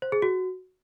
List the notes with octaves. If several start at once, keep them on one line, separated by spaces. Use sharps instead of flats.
C5
G#4
F#4